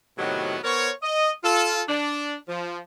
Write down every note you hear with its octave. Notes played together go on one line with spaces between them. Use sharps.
A2 C3 D#3 F#3 B3 F#4
B3 A#4 C5 C#5
D#5
F4 A4
D4
F3